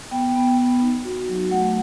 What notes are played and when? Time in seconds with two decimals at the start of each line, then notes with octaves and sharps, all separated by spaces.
0.11 B3 G5
0.36 B3
0.59 B3
0.81 D#4
1.04 F#4
1.29 F#3
1.51 A3 F#5